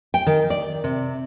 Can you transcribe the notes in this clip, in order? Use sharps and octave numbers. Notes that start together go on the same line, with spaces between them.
G5
D#3
D5
C3